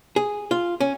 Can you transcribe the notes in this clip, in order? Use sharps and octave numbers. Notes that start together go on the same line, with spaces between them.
G#4
F4
C#4